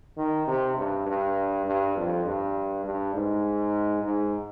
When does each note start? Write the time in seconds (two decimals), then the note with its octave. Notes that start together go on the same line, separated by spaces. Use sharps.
0.17 D#3
0.47 C3
0.77 G2
1.06 G2
1.66 G2
1.96 F2
2.25 G2
2.84 G2
3.14 G#2
4.03 G#2